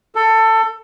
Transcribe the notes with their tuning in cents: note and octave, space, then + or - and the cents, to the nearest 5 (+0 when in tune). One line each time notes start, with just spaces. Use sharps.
A4 +20